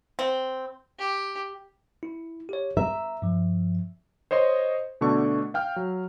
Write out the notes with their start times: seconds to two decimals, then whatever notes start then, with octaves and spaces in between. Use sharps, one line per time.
0.19 C4
0.99 G4
2.03 E4
2.49 G4 C#5
2.77 E5 A#5
3.22 G2 F3
4.31 C5 C#5 D#5 C6
5.01 B2 D3 A3 D4 C#6
5.54 F5 G5 F6
5.76 F#3